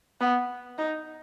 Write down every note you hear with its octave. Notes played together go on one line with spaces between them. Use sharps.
B3
D#4